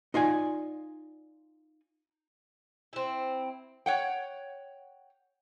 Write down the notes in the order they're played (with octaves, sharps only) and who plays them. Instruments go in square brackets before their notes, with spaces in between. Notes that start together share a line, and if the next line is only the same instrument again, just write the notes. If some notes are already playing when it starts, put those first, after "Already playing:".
[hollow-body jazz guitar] D#4 F4 D5 G#5
[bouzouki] C4 E4
[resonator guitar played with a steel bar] C#5 F#5 G5